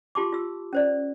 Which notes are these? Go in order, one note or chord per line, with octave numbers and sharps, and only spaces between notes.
F4 G4 A5 C6 D6
F4 E6
C#4 C5 D5